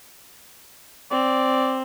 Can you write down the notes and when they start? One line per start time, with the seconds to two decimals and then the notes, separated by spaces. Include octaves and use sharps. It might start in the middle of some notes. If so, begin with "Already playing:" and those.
1.11 C4 D5